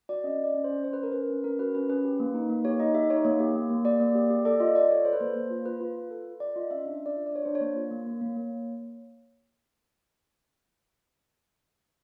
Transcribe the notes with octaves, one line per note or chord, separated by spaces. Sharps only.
F#4 D5
C#4 D#5
C#4 D5
C#4
C5
C#4
C#4 C5
B4
C#4 A#4
C#4 B4
C#4
C#4 A#4
F#4 B4
C#4 B4
C#4 B4
G4
A#3
D#4
A#3
G4 C#5
D#4 D#5
G4 E5
D#4 C#5
A#3 C#5
G4
A#3
A#3
G4 D5
A#3
G4
G4
A4 D5
F4 D#5
F4 D5
A4 C#5
A4 C5
B4
A#3 C5
A#3
F4
F4 B4
F4
F4
A4
A4
F4 D5
F4 D#5
C#4 E5
D4 E5
D4 D5
F4
D5
D4 C#5
D4 C5
C#5
A#3
F4
A#3
A#3
A#3
A#3